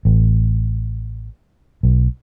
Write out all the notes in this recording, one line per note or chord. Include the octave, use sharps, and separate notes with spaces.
A1
B1